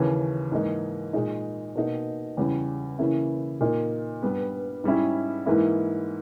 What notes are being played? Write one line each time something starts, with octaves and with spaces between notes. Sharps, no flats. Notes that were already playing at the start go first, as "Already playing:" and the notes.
Already playing: D#2 C#3 E3
G#2 E3 A#3 D#4
A#2 G#3 D#4
B2 A#3 D#4
E2 C#3 G3 C#4
C#3 E3 A#3 C#4 E4
A#2 A#3 D#4
G2 G3 B3
G#2 G3 C#4 E4
G#2 E3 A#3 E4